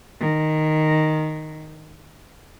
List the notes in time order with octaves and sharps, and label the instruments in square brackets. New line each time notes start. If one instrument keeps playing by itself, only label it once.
[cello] D#3